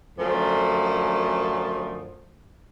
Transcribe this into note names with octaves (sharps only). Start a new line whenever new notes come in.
F#2 D3 F3 A3